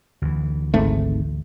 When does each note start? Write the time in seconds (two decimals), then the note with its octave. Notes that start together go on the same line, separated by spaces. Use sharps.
0.22 D2 E3
0.74 G#1 G#2 A3